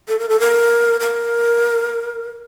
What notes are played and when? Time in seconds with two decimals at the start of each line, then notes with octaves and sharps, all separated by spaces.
0.08 A4
0.19 A#4
0.29 A4
0.39 A#4
1.00 A#4